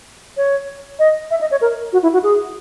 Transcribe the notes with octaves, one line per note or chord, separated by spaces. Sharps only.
C#5
D#5
E5
D#5
C#5
A#4
F#4
E4
F#4
G#4